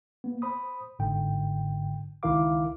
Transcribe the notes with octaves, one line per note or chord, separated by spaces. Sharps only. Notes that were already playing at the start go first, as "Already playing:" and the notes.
A#3 B3
C5 B5 D#6
G1 G#2 D3 G5
C#2 D#3 E4 A#4 F5 D6